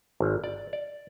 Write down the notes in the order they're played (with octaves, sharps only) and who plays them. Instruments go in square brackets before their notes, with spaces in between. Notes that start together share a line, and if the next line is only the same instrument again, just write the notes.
[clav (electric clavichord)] G#1
D5
D5